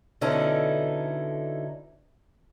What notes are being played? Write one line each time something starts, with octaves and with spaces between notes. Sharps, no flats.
B2 D3 C#4 D#4 E4 A4